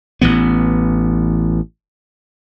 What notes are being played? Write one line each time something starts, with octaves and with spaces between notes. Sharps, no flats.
A1 E3 B3